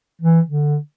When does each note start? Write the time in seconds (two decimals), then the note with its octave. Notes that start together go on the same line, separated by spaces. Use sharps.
0.21 E3
0.49 D3